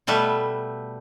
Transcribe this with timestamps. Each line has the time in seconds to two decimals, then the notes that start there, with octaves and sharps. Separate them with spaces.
0.07 B2 G3 A3 B4 E5